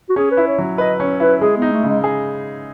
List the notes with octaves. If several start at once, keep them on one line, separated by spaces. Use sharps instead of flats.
F#4
C#4 G#4
B4
E4
C#5
F#3
B4 D#5
C#4 C#5
E4 B4
G#3 G#4
B3 D#4
A3
C#3
G#3
G#4